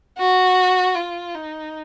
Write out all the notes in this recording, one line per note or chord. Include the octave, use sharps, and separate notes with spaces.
F#4
F4
D#4